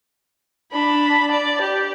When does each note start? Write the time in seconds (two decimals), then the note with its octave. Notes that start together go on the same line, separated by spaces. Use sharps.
0.72 D4 B5
1.31 D5
1.61 G4